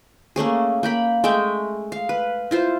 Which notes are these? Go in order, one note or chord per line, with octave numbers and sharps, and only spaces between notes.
A3 A#3 C#4 G#4
A#3 G5 B5
G#3 A3 E5 G5
F5
B4
E4 F4 C5